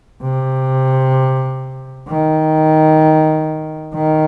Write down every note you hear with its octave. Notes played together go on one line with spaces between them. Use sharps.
C3
D#3
D#3